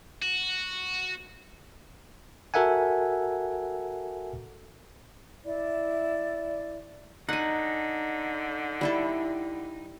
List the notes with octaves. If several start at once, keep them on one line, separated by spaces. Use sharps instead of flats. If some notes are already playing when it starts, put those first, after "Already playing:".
F#4
F#4 A4 A#4 E5 F#5 G#5
E4 D5
D3 D#4 F#5 G#5
G3 E4 A4